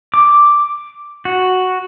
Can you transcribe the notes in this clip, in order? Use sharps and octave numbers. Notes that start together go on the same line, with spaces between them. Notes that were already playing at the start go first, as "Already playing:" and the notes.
D6
F#4